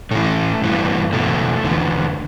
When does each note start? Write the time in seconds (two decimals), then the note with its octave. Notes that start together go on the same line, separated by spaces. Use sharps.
0.11 A2 E3 A3
0.62 G2 E3
1.13 E2 B2 A3
1.64 E2 D3